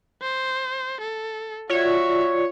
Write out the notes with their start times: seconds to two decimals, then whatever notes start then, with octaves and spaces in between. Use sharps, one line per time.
0.22 C5
1.01 A4
1.70 F4 F#4 C#5 D5 E5